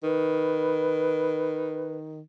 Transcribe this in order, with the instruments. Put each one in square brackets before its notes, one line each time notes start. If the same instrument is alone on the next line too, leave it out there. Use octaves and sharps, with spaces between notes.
[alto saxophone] D#3 [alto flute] B4